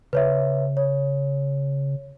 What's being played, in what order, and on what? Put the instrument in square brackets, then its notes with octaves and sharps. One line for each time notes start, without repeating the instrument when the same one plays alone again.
[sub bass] C#3 [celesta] B4 C#5 E5
[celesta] C#5